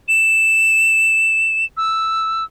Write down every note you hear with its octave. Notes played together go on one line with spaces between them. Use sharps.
E7
E6